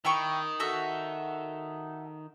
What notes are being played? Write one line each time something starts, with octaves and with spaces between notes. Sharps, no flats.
D#3 E4 G5 C#6
F#4 A4 E5